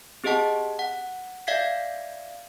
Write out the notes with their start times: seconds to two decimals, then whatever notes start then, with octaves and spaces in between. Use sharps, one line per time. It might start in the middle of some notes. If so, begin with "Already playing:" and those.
0.24 C4 G4 G#4 D#5 F#5 A5
0.79 F#5
1.47 D5 E5 F5 G#6 B6 C7